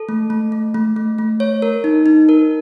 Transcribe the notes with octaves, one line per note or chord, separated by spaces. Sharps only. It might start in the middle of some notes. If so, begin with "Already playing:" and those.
Already playing: A4
A3
A3
A3
A3
A3
A3
C#5
A#4
D#4
D#4
A#4